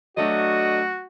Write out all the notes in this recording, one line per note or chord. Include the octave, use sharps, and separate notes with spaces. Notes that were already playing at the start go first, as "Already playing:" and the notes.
F#3 A3 D4 F#4 D#5